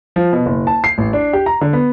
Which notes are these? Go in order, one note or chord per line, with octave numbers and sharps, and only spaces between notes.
F3
B2
F#1
A5
C7
A1
D4
G4
A#5
D3
B3